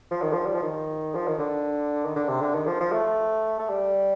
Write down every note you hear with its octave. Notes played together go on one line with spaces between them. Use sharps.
F3
D#3
F3
G3
F3
D#3
F3
D#3
D3
D#3
D3
C3
D3
D#3
F3
F3
A3
A3
G3